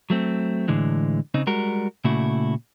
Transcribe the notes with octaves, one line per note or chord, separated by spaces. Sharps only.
F#3 A3 C4
A2 D3 E3 G#3
C#3 C4 D#4
G3 G#3 F#4 A#4
A#2 C#3 A3 E4 F#4